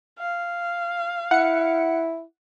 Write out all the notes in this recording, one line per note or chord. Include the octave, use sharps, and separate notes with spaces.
F5
E4 F#5 C#7